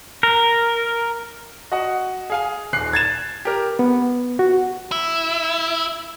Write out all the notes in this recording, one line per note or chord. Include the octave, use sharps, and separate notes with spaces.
A#4
F#4 D#5 F#5
G#4 F5 G#5
D#1 F#6 C7
G#6 A6 E7
G4 A#4
B3
F#4
E4